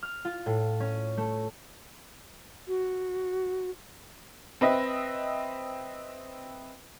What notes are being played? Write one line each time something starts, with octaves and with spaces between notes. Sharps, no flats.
F6
F4
A2
C#4
A3
F#4
C4 B4 D#5 E5